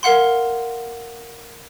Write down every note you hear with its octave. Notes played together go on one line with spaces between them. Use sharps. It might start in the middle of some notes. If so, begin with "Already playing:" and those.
A#4 F5 F#5 C6